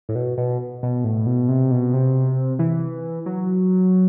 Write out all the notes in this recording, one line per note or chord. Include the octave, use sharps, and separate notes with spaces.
A2
B2
B2
B2
A2
B2
C3
B2
C3
E3
F#3